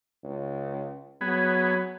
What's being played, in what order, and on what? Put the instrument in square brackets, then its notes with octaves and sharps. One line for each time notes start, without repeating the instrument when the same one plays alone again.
[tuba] C#2
[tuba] F#3 [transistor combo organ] B3 G#4